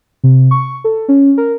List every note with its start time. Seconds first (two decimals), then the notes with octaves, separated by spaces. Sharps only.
0.24 C3
0.51 C#6
0.84 A4
1.08 C#4
1.38 A#4